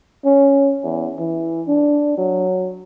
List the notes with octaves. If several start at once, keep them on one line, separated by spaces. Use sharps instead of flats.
C#4
E2
E3
D4
F#3